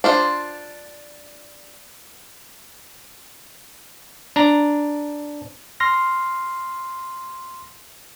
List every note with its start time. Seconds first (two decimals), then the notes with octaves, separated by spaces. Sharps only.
0.04 D4 F4 C5
4.36 D4 A#5
5.80 C6 F6 A#6